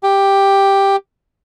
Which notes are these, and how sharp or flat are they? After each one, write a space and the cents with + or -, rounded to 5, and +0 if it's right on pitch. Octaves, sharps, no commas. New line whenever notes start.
G4 +5